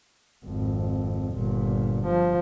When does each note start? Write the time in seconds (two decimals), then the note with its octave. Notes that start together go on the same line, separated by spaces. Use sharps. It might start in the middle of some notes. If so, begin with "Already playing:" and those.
0.45 G#1 F2
1.32 G1 A#2
2.07 F3